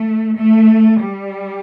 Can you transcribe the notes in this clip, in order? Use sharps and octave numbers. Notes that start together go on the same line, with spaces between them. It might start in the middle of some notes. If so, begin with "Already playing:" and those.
Already playing: A3
A3
G3